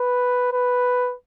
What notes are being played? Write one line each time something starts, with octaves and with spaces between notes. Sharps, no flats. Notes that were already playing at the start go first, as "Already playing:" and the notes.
Already playing: B4
B4